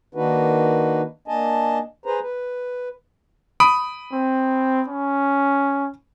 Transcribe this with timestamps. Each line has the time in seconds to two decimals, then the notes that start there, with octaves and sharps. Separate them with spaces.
0.15 D#3 A#3 D4 D#4 F#4 B4
1.28 A#3 D4 D#5 G#5 A5
2.06 G#4 B4 C5 A#5
2.21 B4
3.60 B5 D#6 D7
4.13 C4
4.88 C#4